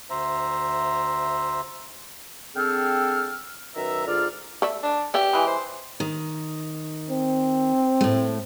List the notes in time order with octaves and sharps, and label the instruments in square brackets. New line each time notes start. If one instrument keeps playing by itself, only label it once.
[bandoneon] D2 C5 E5 A#5
[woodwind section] D3 C4 G#4 A4 G5 F6
F#2 D#3 B4 E5 A#5 E6
G#2 D3 F4 D5 F6
[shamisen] A3 D5 E5
[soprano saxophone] D4
[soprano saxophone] G4 [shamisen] B4 D5 E5
[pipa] E3 G#3
[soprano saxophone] C5
[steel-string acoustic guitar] D#3
[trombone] C4
[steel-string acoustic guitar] A2 A3